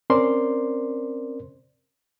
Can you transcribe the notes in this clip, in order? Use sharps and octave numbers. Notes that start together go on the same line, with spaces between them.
C4 C#4 A#4 C5 D5 C6